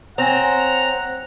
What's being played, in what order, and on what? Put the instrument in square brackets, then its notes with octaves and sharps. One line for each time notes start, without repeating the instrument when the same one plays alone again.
[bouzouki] C4 [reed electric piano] C#5 G#5 [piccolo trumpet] F#5 [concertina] A#5